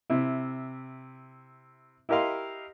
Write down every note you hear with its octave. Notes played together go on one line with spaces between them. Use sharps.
C3 E4
E4 G4 A#4 D#5 F5 C6